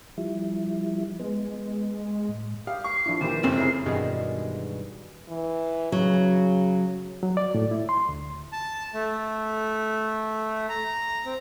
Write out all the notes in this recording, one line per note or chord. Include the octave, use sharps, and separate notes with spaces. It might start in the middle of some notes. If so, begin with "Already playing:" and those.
F3 G3 E4
G#3 B3
A2
G4 F5 D#6
C#6 C7
F3 D4 E4
A#2 D#3 E3 G4 E7
F1 C#2 C4 C#4
E4 G#4 A#4 C7
G2 B2 D#3 E3 G3 G#3
E3
C#3 F#3
F#3
D5
A2
E4
C6
D2
A5
A3
A#5
C4